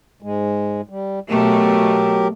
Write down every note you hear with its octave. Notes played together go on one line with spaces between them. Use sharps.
G#2 G#3
G3
B2 F#3 A3 G4 A#4